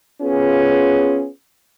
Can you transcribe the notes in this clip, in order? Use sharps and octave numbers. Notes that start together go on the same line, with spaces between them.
B3 C#4 F4 G#4